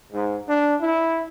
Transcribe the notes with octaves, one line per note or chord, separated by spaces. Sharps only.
G#2
D4
E4